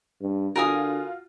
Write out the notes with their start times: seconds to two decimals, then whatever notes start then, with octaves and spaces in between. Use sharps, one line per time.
0.21 G2
0.56 D3 F4 F#4 A#4 G#5 D#6